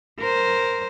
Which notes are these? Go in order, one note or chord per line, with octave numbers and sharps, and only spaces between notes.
A#4 C5